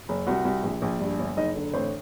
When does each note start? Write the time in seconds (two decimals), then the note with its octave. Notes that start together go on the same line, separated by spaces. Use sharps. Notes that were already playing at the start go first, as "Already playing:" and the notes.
0.09 F#1
0.27 C2 F#4 F#5
0.45 C2
0.63 A#1
0.82 A#1
1.00 G2
1.19 G1
1.37 F#1 D#4 D#5
1.55 D3
1.73 A1 C4 C5